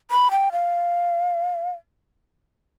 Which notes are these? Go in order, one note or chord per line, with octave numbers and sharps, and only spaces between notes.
B5
G5
F5